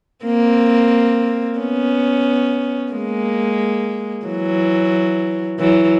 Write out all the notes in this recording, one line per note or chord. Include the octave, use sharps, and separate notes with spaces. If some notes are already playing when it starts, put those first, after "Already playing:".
A#3 C4
B3 C#4
G#3 A#3
E3 F#3
E3 F#3